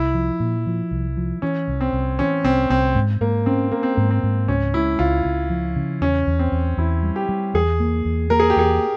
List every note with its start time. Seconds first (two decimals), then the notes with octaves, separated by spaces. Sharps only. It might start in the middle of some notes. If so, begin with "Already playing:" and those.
Already playing: C2 E4
0.15 F3
0.40 A#2
0.66 F3
0.91 C2
1.17 F3
1.42 E3 C#4
1.68 C2
1.81 C4
1.93 C2
2.19 E3 C#4
2.44 C2 C4
2.70 C2 C4
2.95 G#2
3.21 G#2 A#3
3.46 C4 C#4
3.72 A#3 C#4
3.83 C4
3.95 G#2 A#3
4.10 C4
4.23 G#2
4.48 C#2 C#4
4.74 G#3 E4
4.99 C#2 F4
5.25 C#2
5.50 F3
5.76 C#3
6.01 E2 C#4
6.27 E2
6.39 C4
6.52 E2
6.77 E2 E4
7.03 G3
7.16 G4
7.29 G3
7.54 E2 G#4
7.80 A#3
8.05 E2
8.30 A#3 A#4
8.40 G#4
8.50 G4
8.56 E2 G#4